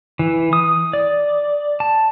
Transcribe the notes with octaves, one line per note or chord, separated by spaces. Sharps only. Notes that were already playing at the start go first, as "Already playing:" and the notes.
E3
D#6
D5
A5